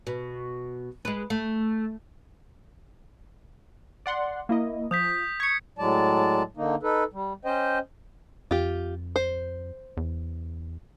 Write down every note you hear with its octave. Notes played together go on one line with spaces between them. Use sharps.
B2
G#3 B4
A3
D5 F#5 C6
A#3 E4 D#5
F3 D#6 G6 B6
C#6 G#6 C#7
A2 F#3 G#3 D5 A5
D3 A#3 D#4
D#4 A4 B4
G3
C#4 C5 D#5 G5
F2 F4 G4
C5
E2